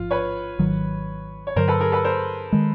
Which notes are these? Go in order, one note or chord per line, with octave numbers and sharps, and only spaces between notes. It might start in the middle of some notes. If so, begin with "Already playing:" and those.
Already playing: A1 G#2 F3 F4
B4 C#5
G#1 G#2 D#3 F#3
C#5
G2 D3 F#3 A#4 C5
A4 B4
G#4 A#4
A4 B4
A#4 C5
D#3 G#3